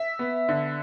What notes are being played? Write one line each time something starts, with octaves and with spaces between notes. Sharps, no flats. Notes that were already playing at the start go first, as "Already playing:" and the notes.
Already playing: E5
B3
D3